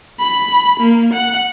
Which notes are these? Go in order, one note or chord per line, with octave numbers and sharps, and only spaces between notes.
B5
A#3
F#5